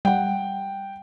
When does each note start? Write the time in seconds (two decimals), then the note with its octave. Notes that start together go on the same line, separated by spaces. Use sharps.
0.05 G3 F#5 G5